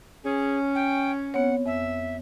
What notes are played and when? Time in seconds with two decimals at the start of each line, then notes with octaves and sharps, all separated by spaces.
0.24 C#4 G#4
0.75 G5
1.34 B3 C4 C#5 F#5
1.66 F2 E5